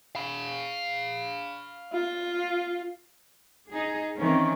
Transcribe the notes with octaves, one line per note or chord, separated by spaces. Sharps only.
F5 B5
F4
D#4 G#4
D#3 E3 C4 C#4